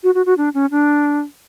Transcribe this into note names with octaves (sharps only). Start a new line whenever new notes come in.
F#4
F#4
F#4
D4
C#4
D4